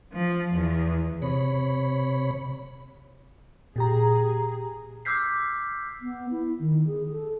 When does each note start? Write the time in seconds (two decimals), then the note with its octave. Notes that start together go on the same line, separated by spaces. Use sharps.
0.12 F3
0.53 E2
1.22 C3 C#5 B5
3.76 A#2 G4 G#4 A#5
5.05 D6 E6 F6 G6 B6 C7
6.02 B3
6.31 E4
6.59 D#3
6.87 G#4
7.11 A4